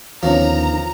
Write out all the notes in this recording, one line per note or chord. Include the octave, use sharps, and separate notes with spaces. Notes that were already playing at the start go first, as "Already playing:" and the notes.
D#2 D3 D#3 F3 B3 C#4 A#5